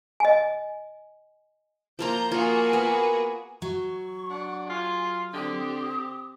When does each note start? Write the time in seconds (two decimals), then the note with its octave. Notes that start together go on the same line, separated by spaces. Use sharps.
0.20 D#5 G#5
1.99 F3 A#3 F4 A#5 G6
2.32 A#3 F4 F#4 G#4
2.73 B3
3.62 F#3 C#6
4.30 D4 F#5
4.70 F4 G#4
5.33 D3 C4 G4 D#6